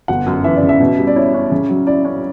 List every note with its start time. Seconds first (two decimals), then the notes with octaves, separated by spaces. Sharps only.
0.08 G1 F#5
0.26 F#2
0.44 E3 E5
0.56 D5
0.62 C#3
0.69 E5
0.80 B2
0.98 G3
1.07 D5
1.16 E4 C#5
1.34 C#4
1.51 C#3
1.69 F#3
1.87 E4 D5
2.05 C#4